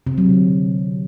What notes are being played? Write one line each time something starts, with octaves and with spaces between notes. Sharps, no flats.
C3
F#3
D3